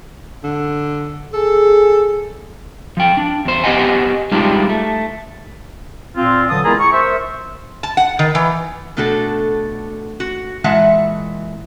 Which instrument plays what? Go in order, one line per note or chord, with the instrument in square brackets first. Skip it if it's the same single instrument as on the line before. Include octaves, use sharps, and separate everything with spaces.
[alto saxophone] D3
[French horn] G#4 [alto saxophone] A4
[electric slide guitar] F3 G5
D4
E2 C5
B3 G4 C5 D#5 F#5 G#5
G3 G#3 D4 D#4 F4 G4
A3
[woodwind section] A#2 C4 F4
D3 E3 F#3 A5 D#6
G#3 B3 E4 F4 G#4 A#4
C#6
A#4 C5 E5
[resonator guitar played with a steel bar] A5
F#5
D#3
E3
B2 A3 D4 F#4 A4
F#4
A#2 E3 G#3 E5 F#5 A5